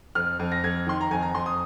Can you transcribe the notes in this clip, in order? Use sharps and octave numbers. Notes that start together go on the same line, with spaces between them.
F2 F6
F2
A#6
F2 G#6
D#3 C6
A#5
F2 G#5
A#5
F2 C6
D#6